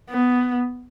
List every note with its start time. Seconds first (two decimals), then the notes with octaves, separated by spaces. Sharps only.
0.10 B3